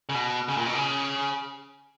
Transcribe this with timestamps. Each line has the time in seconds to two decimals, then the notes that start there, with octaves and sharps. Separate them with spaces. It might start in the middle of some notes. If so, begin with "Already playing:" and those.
0.09 C#3
0.14 B2
0.48 C#3
0.57 A#2
0.66 B2
0.74 C#3